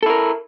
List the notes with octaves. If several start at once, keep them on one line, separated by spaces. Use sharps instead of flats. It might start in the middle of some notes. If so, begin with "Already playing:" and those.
E4 A4 A#4